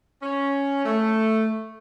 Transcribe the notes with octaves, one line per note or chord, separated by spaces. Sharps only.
C#4
A3